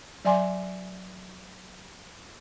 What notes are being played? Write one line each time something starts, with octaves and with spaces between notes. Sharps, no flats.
F#3 D5 E5 G#5 C6 D6